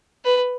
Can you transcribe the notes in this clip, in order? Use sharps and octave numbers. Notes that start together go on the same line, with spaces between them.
B4